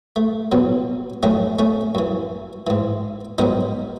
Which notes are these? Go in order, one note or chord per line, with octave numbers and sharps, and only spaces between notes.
A3
E2 B2 F#3
F#2 D#3 F#3 A3 C#4
A3 C#4
F#2 E3
G#2 E3
G#2 D#3 F#3 B3 D#4